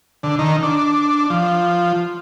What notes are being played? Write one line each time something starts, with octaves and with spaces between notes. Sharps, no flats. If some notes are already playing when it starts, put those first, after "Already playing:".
D3
D#3
D4
F3